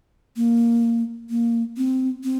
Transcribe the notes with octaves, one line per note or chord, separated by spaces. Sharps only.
A#3
A#3
C4
C4